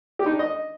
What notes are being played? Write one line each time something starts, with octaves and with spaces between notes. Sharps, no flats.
G4
D#4
D4
D#5